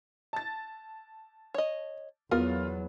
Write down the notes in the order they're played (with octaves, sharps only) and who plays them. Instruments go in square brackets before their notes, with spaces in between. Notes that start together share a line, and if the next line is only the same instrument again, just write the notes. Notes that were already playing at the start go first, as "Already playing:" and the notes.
[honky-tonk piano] A5 A6
[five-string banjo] C#5 D#5
[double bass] E2 F#3 [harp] B3 [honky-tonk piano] F4 [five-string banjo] A#4